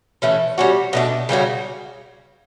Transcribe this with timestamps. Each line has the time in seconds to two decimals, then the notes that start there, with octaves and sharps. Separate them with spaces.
0.22 E3 A3 C#4
0.58 G3 C#4 F#4
0.93 B2 A3 D4
1.29 C#3 G3 C#4 F#4